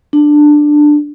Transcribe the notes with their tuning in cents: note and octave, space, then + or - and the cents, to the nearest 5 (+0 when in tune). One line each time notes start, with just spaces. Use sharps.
D4 +10